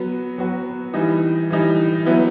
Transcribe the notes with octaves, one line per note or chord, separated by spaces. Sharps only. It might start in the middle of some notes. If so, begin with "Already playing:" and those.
Already playing: F#3 B3 F#4
F#3 B3 F#4
E3 G3 D#4
E3 G3 D#4
F#3 B3 E4